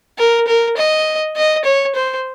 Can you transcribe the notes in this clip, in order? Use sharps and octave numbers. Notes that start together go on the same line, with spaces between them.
A#4
A#4
D#5
D#5
C#5
C5